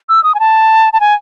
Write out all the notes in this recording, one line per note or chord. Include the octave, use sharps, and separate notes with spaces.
E6
D#6
G#5
A5
A5
G#5